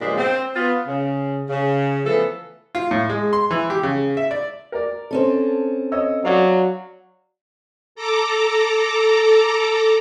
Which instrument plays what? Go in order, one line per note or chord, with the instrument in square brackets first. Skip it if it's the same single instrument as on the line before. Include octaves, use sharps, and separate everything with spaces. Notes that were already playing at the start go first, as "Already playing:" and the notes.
[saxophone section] G2 A#2 C#3 F3 G#3 D4
C4
B3 F4
C#3
C#3
E3 F3 A3 B3 A4
[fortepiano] F4
A2
G#3
C6
E3
G4
C#3
E5
D5
A#4 D5
[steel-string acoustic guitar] C4 C#4 A4
[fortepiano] C#5 D#5 E6
[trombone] F#3 [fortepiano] D4 F5
[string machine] A4 A#5 D6